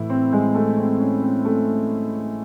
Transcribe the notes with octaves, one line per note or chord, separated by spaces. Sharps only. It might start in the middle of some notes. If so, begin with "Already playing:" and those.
Already playing: A2 E3 E4
C4
G#3
A3
C4
C#4
C4
A3